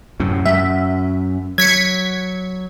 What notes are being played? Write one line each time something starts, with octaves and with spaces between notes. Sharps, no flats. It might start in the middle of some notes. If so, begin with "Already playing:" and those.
F#2 A2 C3
F#2 E5
F#3 G#6 B6 C#7